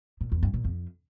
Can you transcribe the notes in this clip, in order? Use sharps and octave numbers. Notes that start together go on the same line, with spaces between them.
A#2
E2
G2
A#2
F2